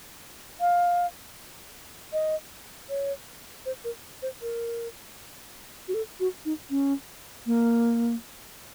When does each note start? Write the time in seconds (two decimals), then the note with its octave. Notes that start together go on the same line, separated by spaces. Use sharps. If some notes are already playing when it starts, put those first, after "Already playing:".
0.61 F5
2.13 D#5
2.90 C#5
3.66 C5
3.84 A#4
4.22 C5
4.42 A#4
5.88 F#4
5.94 A4
6.20 F#4
6.45 D#4
6.70 C#4
7.46 A#3